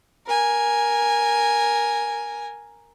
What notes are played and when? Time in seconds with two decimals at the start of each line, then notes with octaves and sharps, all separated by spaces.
0.27 A#4 G#5